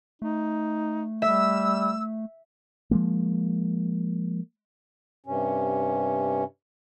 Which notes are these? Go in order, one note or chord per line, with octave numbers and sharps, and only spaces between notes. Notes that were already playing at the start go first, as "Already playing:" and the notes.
A3 D#4
G3 E5 E6
F3 G#3 A#3
G2 C3 C#4